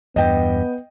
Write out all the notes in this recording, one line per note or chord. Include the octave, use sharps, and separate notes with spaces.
E2 G2 B3 D#5 G5